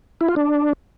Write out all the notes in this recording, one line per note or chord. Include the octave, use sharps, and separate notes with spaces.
E4
F4
D4